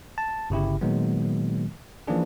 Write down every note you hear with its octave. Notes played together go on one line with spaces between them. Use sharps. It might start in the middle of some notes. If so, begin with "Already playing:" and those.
A5
G1 C#3 E4 G4
A#2 D#3 F#3 G#3 A#3 B3
E3 F3 A#3 C#4 D4 G#4